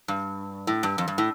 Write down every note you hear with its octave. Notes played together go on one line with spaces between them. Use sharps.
G2
A2
G2
F2
G2
A2